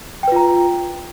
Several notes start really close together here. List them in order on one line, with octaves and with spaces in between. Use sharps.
G5 B4 F4 A#5